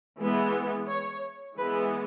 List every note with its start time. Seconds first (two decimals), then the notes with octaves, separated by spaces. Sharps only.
0.18 E3 G#3 B3
0.88 C#5
1.57 E3 G#3 B3 B4